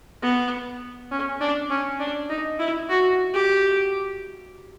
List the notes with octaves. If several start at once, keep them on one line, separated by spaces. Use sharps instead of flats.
B3
C#4
D4
C#4
D4
D#4
E4
F#4
G4